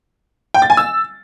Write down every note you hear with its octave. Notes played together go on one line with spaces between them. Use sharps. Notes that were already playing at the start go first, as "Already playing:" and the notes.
G5
A6
G#5
E6